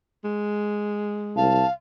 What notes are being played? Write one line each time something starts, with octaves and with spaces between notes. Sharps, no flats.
G#3
C2 F5 A5